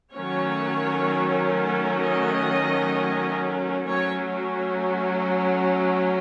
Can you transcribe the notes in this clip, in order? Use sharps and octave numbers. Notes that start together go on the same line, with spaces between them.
D#3 F#3 A3 C#4 C#5
D#5
F#3 A3 C#4 C#5